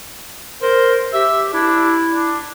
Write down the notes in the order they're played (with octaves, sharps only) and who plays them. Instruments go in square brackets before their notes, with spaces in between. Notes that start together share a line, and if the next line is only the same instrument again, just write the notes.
[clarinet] A#4 [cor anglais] C5
[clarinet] G4 [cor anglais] E5
[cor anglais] D4 [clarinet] E4
[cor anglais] D4